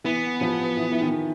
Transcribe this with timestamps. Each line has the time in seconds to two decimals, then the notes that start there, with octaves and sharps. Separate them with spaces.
0.04 E3 B3
0.41 F3
0.77 E3
0.92 E3
1.01 D#3